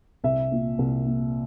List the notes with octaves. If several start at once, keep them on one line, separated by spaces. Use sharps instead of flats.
C2 E5
A#2
C2
A#2